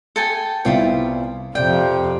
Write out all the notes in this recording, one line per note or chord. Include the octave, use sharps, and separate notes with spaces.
A4 G5 G#5
C2 B3 C4 E4 F4 G5
F2 C3 D5 G5